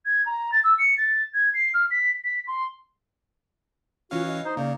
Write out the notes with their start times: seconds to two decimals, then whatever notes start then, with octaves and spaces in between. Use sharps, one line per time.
0.06 G#6
0.26 A#5
0.52 A6
0.64 E6
0.78 C#7
0.98 A6
1.34 G#6
1.54 C7
1.74 F6
1.91 B6
2.24 B6
2.47 C6
4.11 E3 C#4 F4 F#4 F5
4.27 D#5
4.45 D#4 C5
4.57 C#3 A#3 D#4 D5